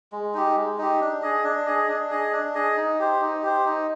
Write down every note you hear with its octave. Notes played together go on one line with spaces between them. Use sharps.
G#3
D#4 G4
G#3
D#4 G4
D4
G#4 D#5
D4
G#4 D#5
D4
G#4 D#5
D4
G#4 D#5
D#4
G4 C5
D#4
G4 C5
D#4